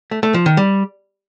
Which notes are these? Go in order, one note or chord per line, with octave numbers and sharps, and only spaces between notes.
A3
A3
F3
D#3
G3